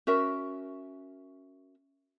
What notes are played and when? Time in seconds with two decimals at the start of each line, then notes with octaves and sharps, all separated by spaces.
0.07 C#4 F#4 A#4 E5